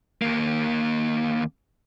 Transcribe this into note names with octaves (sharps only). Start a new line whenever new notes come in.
D#2 A#3